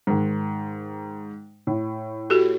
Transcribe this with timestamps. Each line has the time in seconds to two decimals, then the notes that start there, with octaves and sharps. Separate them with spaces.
0.07 G#2 D#3
1.67 A2
2.30 F#4 G4 A4